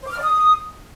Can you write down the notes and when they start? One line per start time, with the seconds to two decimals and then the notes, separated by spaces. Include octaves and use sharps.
0.01 C5
0.06 D6
0.12 F6
0.17 D5
0.22 D#6